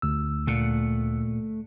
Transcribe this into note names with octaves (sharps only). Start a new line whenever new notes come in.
D2 E6
A#2 A3 F#5